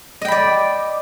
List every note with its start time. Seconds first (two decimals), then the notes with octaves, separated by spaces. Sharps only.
0.21 D#5
0.25 G5
0.28 B5
0.32 D5